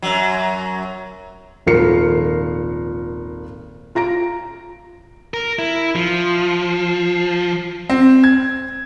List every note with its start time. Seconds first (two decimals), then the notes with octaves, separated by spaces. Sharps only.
0.02 F#2 F#3
1.66 D#1 G#1 F3 A#4 C7 C#7
3.95 F4 A#5 A#6 D7
5.34 A#4
5.59 E4
5.96 F3
7.90 C4
8.24 G#6